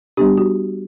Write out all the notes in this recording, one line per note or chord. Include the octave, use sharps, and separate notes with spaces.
G3 B3 D4 G4
F#4